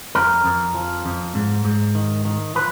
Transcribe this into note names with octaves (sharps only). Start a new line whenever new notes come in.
F2 A#4
F2
F3
F2
G#2
G#2
D#3
D#3
F3 B4